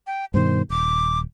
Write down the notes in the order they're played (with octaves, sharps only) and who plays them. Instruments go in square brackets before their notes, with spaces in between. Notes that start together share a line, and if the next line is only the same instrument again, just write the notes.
[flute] G5
[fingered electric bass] G2 B2 D#3 [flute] C5
[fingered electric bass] D#1 [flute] D6